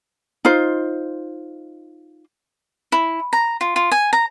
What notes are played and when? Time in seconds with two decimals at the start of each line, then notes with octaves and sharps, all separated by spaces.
0.45 D#4 F4 C5
2.92 E4
3.33 A#5
3.61 F4
3.76 F4
3.91 G#5
4.13 A#5